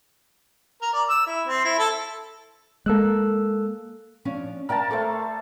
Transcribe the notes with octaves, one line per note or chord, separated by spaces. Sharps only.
A#4
D5
E6
E4
C4
E4
A4
G#3 A#3 A4 E6 F#6
F3 C#4 D4
A#4 D5 F5 G5 A5
A3 A4 C5 D5